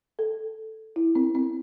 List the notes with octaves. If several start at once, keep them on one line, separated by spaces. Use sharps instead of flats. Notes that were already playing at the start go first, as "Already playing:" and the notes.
A4
E4
C4
C4